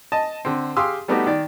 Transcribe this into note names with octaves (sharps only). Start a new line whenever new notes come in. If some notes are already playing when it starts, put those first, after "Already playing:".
D#5 A5
D3 C4
G4 G#4 F5 C6 D#6 E6
G3 A3 B3 D#4 F#4 G4
D#3 D5